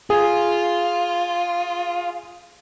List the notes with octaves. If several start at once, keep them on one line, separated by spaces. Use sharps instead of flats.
F4 G#4